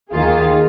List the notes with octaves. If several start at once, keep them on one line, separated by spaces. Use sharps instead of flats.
D#2 D#3 A#3 F4 G#4